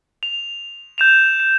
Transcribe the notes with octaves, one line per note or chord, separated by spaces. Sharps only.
F7
G6 E7 F7
E7